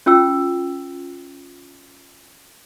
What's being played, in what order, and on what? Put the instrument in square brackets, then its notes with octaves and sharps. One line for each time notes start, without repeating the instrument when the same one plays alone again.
[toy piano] C#4 F4 G5 E6